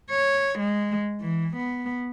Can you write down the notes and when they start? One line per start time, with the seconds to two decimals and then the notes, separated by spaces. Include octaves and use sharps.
0.11 C#5
0.59 G#3
1.21 E3
1.56 B3